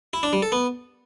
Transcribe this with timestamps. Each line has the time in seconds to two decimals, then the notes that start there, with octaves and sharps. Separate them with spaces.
0.13 E4
0.23 D4
0.33 G3
0.42 A4
0.52 B3